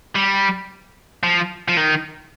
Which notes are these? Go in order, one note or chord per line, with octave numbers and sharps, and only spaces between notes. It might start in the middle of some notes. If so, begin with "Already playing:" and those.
G3
F3
F3
D#3